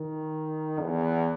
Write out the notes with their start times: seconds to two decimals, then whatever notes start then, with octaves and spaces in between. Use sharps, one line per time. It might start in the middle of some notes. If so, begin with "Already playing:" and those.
Already playing: D#3
0.81 E2